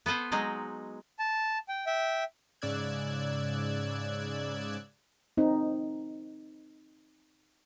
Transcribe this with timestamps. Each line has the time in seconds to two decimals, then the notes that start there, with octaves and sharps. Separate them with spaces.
0.06 B3 A4 B4 C5
0.32 F#3 G#3 D#4
1.19 A5
1.69 G5
1.86 E5 G5
2.62 G#2 C#3 D5 E6 F#6 G#6
5.37 C4 D#4